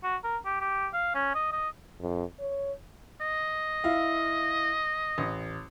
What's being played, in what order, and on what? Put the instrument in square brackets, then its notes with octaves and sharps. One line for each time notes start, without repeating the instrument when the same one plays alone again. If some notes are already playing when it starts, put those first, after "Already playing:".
[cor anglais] F#4
A#4
G4
G4
F5
C#4
D#5
D#5
[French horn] F2
C#5
[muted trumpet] D#5
[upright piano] E4 F5
A1